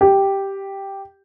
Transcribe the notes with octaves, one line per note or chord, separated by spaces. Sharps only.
G4